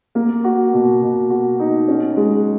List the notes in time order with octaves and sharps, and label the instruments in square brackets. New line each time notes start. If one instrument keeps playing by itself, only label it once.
[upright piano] A#3
F#4
B2
B2
F#4
D#4
C#4
G#3